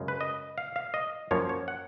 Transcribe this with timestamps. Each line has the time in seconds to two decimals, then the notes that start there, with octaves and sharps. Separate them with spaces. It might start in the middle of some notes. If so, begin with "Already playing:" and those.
Already playing: F#2 C#3 G#3
0.08 B4
0.21 D#5
0.58 F5
0.76 F5
0.94 D#5
1.31 F#2 F3 A#3 C#5
1.49 C#5
1.68 F#5